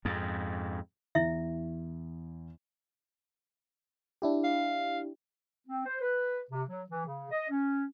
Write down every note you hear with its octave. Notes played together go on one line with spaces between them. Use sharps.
F2 G#2
E2 E4 E5
D4 E4 G4
F5
C4
C5
B4
C3
F#3
E3
C#3
D#5
C#4